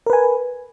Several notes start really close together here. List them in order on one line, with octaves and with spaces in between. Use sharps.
A#4 B4 G#5